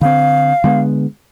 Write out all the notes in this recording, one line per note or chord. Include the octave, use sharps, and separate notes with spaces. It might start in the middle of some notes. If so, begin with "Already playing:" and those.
D3 C4 F5
D3 G#3 B3